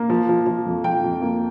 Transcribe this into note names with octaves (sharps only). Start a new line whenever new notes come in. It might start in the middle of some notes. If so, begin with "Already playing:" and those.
Already playing: A#3
F3
F3
F3
F2
F2 G5
F2
A#3